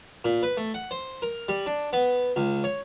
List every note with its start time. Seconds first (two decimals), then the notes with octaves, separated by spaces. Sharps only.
0.25 A#2
0.43 B4
0.57 A3
0.74 F#5
0.91 C5
1.22 A#4
1.49 G3
1.66 D4
1.93 B3
2.36 C#2
2.64 C#5